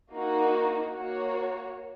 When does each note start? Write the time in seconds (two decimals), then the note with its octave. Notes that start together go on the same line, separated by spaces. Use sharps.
0.12 A#3 D#4 F#4
0.94 A#3 F#4 C#5